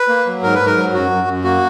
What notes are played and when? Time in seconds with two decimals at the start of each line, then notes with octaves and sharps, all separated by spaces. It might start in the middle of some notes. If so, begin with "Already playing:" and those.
Already playing: B4
0.09 A#3
0.26 F#3
0.43 G#2 A#4
0.54 B4
0.60 G#2
0.66 A#4
0.77 F#3
0.94 F#2 F#4
1.11 F#2
1.28 F#2
1.44 A#3 F#4